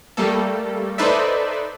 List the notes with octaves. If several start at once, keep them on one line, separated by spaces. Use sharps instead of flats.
G3 A3 A#3 A4
D#4 A4 B4 C5 D5 E5